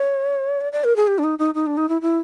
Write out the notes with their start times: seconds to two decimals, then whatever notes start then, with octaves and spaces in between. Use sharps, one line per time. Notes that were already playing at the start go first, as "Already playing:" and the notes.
Already playing: C#5
0.61 D5
0.72 D5
0.84 A#4
0.96 G#4
1.07 G4
1.18 D4
1.24 D#4
1.39 D#4
1.54 D#4
1.66 D4
1.77 D#4
1.89 E4
2.01 E4